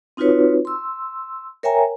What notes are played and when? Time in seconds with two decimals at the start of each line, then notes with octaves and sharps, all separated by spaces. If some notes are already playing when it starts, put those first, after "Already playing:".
0.17 C4 D#4 F4 F#4 B4 C#5
0.65 C6 E6
1.63 A#4 C#5 E5 G5 G#5 A#5